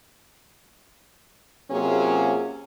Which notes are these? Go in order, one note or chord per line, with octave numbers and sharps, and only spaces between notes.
C3 F#3 A#3 C#4 F4 G#4